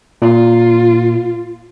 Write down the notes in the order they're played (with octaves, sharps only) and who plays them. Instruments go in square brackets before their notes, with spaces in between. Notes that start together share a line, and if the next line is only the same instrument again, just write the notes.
[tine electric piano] A#2 [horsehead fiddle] F4